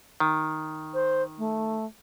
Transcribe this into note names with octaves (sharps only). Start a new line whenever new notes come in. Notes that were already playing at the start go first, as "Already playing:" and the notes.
D#3
C5
A3